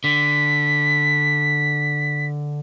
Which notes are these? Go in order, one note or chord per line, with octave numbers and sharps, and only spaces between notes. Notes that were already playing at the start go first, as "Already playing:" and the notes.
D3 B6